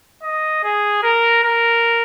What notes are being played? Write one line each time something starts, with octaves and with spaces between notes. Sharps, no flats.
D#5
G#4
A#4
A#4